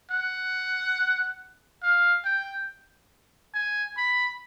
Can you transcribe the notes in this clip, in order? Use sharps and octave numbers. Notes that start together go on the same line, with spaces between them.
F#5
F5
G5
G#5
B5